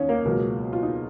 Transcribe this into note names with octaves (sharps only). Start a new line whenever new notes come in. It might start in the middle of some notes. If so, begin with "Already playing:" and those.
Already playing: D#2 C#4 D#4 C#5
A#3 A#4
C#2 B2 F#3 A#3 A#4
F4
D#4